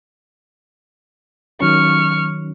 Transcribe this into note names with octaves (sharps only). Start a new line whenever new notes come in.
D#3 F#3 C#4 C#6 F6